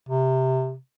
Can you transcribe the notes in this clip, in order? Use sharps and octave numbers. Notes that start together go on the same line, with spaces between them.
C3